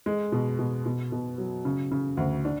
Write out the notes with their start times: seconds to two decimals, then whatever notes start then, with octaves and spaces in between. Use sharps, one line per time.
0.06 G#3
0.32 B2
0.59 B2
0.86 B2
1.12 B2
1.38 F#3
1.65 C#3
1.91 C#3
2.17 D2
2.45 D4